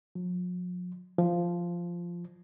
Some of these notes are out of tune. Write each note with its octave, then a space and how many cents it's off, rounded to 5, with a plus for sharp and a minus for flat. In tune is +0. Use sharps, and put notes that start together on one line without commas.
F3 +45
F3 -10